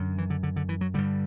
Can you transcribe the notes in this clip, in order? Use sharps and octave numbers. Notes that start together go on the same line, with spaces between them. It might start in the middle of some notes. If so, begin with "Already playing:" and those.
Already playing: F#2 D3
E3
D3
D3
D3
E3
F#3
G2 D3 G3